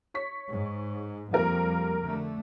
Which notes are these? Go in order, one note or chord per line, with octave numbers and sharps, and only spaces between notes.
C#5 C#6 B6
G#2
F2 G3 A#3 G4 A#4
D3 A3